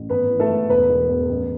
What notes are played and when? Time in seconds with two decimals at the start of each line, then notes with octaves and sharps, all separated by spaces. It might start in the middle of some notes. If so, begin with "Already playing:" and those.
Already playing: A1
0.10 G#1 B3 B4
0.29 E3
0.40 A3 A4
0.49 G#2
0.69 E1 B3 B4
0.90 E1
1.09 E2
1.29 A1